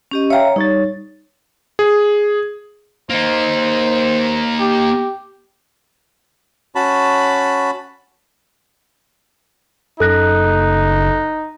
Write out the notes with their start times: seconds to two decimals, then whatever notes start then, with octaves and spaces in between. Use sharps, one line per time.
0.11 C#4 G4 D#5
0.30 C#5 E5 F5 G5 A#5
0.56 G3 D#4 C#5 A6
1.79 G#4
3.10 A#3 D#4 C5
4.60 G4
6.75 C#4 F#4 A5 B5
10.00 F#1 D#4 A4 F#6 A#6